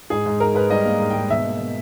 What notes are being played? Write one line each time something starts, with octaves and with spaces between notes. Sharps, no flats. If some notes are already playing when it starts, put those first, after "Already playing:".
G#2 G#4
G#2
G#2 A#4
G#2 B4
G3 D#5
A#3
G#2
G5
G#2
B2 E5
A#3
B2